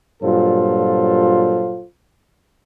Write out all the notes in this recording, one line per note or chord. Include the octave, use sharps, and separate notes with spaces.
G2 A#2 F#3 F4 A4 C5